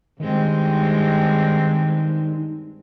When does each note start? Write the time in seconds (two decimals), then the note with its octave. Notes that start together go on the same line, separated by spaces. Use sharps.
0.20 G2 D#3 G#3 C4